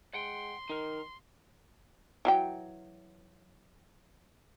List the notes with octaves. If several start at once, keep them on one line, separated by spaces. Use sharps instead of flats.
G#3 F#5 G5 C6
D#3 D#4 A#4
E3 F#3 G5